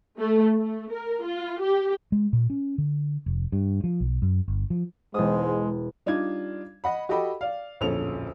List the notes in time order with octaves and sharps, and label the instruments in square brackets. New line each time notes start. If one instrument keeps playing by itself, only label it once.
[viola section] A3
A3
A#4
F4
G4
[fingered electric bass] G#3
A#2
C#4
D3
F1
G2
F3
B1
F#2
G1
F3
[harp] E1 D#6 [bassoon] G#2 [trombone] G#3
[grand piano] G3 D4 D#4 F4 G#6
D#5 F#5 B5
F#4 G4 A4 D#5 G5 B5
D5 F5
D1 A#1 F2 C#4 A4 F7